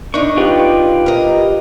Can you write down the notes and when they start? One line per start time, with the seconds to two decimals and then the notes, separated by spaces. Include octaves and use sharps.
0.14 D4 D#4 C#6
0.37 F4 G4 B4
1.06 A#4 D#5